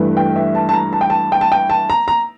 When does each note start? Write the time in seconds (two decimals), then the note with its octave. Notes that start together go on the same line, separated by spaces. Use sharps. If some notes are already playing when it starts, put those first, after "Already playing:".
Already playing: G2 E3 A3
0.17 G5
0.36 E5
0.55 A5
0.69 A5
0.74 A#5
0.93 A5
1.01 G5
1.10 A5
1.32 G5
1.41 A5
1.52 G5
1.70 A5
1.90 A#5
2.08 A#5